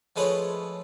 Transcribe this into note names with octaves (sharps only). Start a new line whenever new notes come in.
F3 G#3 A3 B4 C#5